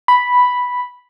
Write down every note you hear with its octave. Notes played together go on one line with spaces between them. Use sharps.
B5